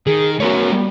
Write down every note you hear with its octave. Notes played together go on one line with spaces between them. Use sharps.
D#3 G#4
A3 B3 F#4 A#4 C#5
G3